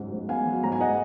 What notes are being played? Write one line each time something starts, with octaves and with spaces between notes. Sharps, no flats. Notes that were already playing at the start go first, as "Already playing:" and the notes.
Already playing: C#2 G#2 F#3
G#2
B3 F5 G#5
F#3
G#2 A#5
G#5
D#5 F#5